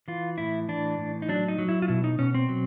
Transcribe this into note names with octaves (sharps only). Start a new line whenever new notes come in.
E3 F4
A2 E4
E3 D4
A2
D#4
F#3 D4
D#4
F#3
E4
F4
B2 E4
D#4
B2 C#4
C4
F#3